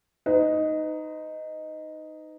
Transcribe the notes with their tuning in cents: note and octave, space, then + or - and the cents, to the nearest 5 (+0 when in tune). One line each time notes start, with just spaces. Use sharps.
D#4 +0 B4 +40